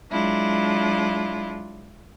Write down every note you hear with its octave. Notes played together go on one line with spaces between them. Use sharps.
F#3 G#3 D4 E4 F4